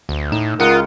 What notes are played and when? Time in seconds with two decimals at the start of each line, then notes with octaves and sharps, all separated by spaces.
0.09 D2
0.32 A2 D#4 E7
0.60 C#2 F4 A#4 F#5 D#6 C#7